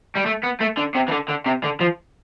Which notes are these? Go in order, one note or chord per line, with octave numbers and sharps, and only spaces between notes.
G3
A3
B3
A3
D3
C3
E3
D3
D3
C3
D3
F3